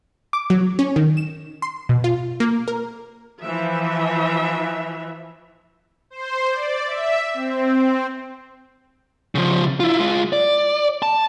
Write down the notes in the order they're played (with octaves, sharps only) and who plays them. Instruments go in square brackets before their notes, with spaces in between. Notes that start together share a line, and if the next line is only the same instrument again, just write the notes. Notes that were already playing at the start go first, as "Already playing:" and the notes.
[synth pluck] D6
F#3
C#4
D#3
E7
C6
B2
F4
A#3
A#4
[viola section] E3 F3 E5
[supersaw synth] C5
D5
E5
C4
[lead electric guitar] C#3 F3
E4 F4
G#3 F4
D5
A5